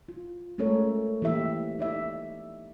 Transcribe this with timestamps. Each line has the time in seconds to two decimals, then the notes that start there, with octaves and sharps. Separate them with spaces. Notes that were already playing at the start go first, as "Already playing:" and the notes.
0.09 F4
0.58 G#3 A3 C#4 A4 A#4 C#5
1.22 E3 A#3 G4 E5
1.79 D#4 D5 E5